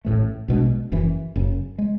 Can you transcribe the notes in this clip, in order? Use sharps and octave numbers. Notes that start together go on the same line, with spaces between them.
A1 A2 E3 A3
B1 B2 G#3 D4
F#1 F#2 E3
F#1 F#2 C#3
G#3